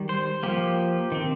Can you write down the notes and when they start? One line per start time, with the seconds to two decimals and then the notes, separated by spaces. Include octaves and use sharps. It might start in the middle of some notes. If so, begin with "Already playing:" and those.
Already playing: D#3 G3
0.09 C5
0.43 F3 A#3 G4
1.12 D#3 C4